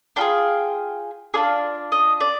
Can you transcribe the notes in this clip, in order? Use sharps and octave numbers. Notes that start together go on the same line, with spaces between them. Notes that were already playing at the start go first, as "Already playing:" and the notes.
D4 F4 G#4 G5
D4 F4 G#4 D5
D#5
D5